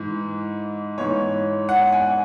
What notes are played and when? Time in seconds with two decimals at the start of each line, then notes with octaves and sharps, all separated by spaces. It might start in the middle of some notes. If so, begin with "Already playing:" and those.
Already playing: G#2 E3
0.98 G#2 E3 C#5
1.69 F#5
1.92 G#5